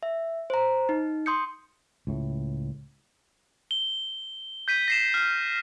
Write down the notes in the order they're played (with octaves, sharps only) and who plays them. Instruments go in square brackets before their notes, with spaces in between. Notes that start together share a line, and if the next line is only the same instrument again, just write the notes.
[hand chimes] E5
C5 A#5
D#4
C6 D#6 G6 C#7
[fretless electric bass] C#2 A2
[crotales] G7
G6 B6 D#7
A#6 C7 E7
F6